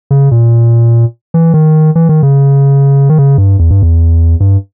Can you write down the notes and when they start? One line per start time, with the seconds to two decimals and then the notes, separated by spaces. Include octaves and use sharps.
0.11 C#3
0.31 A#2
1.34 E3
1.54 D#3
1.95 E3
2.09 D#3
2.23 C#3
3.09 D#3
3.18 C#3
3.38 G2
3.59 E2
3.70 G2
3.82 E2
4.40 G2